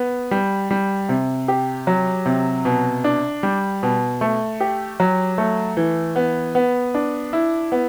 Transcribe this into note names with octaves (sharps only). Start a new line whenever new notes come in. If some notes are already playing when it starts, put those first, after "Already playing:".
Already playing: B3
G3
G3
C3
G4
F#3
C3
B2
D4
G3
B2
A3
G4
F#3
A3
E3
B3
B3
D4
E4
B3